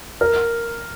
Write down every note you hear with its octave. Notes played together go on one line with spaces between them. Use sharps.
A#4 F6